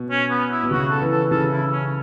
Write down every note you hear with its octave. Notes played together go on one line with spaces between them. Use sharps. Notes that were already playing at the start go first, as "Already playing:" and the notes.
Already playing: B2
C#4
B3
E4
B2
C#3 F#4
A4
E3
A4
C#3 A4
E4
C#4